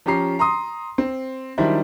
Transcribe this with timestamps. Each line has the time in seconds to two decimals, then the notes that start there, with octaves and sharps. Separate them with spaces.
0.06 F3 C#4 G4 A#5 C7
0.39 A#5 C6 D#6
0.98 C4
1.58 D#3 F#3 G3 D4 E4 C5